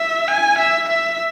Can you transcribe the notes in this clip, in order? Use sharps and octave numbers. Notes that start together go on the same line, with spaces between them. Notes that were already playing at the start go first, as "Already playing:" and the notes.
Already playing: E5
G#5
E5
E5